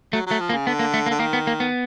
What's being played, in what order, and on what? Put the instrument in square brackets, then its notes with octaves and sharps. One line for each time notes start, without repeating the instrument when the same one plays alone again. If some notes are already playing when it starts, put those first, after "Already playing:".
[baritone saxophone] F#3 [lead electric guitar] A3
[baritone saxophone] F#3 [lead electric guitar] A3
[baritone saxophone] F3
[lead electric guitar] A#3
[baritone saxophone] C#3
[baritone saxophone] D3 [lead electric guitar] B3
[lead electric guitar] A#3
A3
A#3
[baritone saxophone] D3
[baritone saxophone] D#3 [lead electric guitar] A#3
[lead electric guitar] B3
A#3
B3